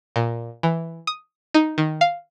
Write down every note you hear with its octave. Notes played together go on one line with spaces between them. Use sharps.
A#2
E3
D#6
D#4
D#3
F5